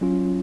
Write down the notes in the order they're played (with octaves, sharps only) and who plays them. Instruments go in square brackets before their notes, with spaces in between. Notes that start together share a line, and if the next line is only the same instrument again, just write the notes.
[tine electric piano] F#3 C#4 F4